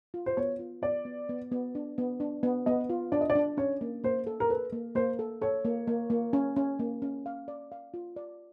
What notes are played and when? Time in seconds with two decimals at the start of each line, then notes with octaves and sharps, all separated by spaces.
0.14 F4
0.26 C5
0.37 B3 C#5
0.59 F4
0.82 B3 D5
1.05 B3
1.29 B3
1.52 B3
1.75 D4
1.98 B3
2.20 D4
2.43 B3
2.66 B3 D#5
2.90 F4
3.12 D4 D5
3.21 D#5
3.30 D5
3.35 D4
3.57 C#4 C#5
3.81 A#3
4.04 A#3 C5
4.27 A4
4.40 A#4
4.49 A4 B4
4.72 A#3
4.95 A#3 C5
5.19 A4
5.42 A4 C#5
5.65 A#3
5.87 A#3
6.10 A#3
6.33 C#4
6.56 C#4
6.79 A#3
7.02 C#4
7.26 F5
7.48 D5
7.72 F5
7.94 F4
8.16 D5